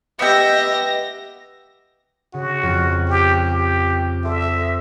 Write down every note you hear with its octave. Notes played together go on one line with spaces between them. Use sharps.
B3 G4 D#5 E5 G5 A#6
C#3 F#4
F2
G4
G4
A4 C5 E5 D6